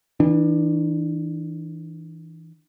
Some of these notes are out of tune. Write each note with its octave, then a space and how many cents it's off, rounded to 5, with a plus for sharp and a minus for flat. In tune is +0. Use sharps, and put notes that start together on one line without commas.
E3 -20 D4 +25